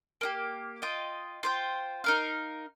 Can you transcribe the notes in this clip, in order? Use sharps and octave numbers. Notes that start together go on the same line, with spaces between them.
A#3 D#4 G4
F4 D#5 G5
F4 C5 G5
D#4 A#4 F5